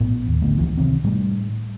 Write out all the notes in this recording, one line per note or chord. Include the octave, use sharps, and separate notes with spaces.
A#1 A2 B3
D#2
G#1 D3 A3 B3
C#2 E3 F3
C3 D#3 C4
A2 G3 A3